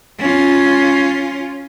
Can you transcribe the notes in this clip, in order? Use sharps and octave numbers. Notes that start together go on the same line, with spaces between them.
C#4 F4